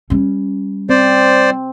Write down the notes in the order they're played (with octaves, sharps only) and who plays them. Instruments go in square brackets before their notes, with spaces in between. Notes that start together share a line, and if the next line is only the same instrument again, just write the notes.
[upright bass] G3 C#4
[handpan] C4 [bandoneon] C5 D5